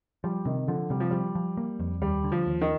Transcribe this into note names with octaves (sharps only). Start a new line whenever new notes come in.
F3 G3
C3 D#3
D3 F3
C3 G3
F3
F3 G3
F3
A#3
F2
D#2 G3
D3
F3
D#2
D#3